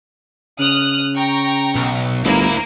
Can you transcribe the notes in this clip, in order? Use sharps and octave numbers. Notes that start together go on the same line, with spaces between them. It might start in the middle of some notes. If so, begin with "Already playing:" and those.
C#3 D#6 F6 F#6
G5 A#5 C#6
B1
G1 D2 A#3 E4